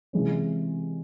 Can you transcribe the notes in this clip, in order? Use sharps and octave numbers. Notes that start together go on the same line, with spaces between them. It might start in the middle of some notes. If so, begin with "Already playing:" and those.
C3 E3 G#3 C#4